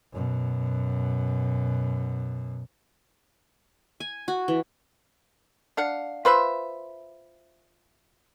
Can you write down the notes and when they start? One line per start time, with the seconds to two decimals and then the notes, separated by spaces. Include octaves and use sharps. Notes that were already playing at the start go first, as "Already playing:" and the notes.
0.12 F#2 B2
4.00 G#5
4.28 F#4
4.48 E3
5.77 D4 F5 F#5
6.25 F4 B4 C5 E5